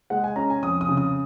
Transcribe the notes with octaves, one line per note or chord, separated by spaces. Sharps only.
G#3 F#5
G#5
C#4 A#5
G#5
F2 D#6
D#6
C#3
D#6